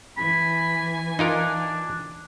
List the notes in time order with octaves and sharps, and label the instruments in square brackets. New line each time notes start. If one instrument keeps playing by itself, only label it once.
[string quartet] E3 G#5 [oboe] B5
[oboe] D4 [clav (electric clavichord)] D#4 F4 A#4